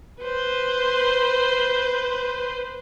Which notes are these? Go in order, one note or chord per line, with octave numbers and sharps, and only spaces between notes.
B4 C5